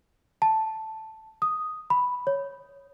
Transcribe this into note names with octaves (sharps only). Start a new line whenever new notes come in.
A5
D#6
B5
C#5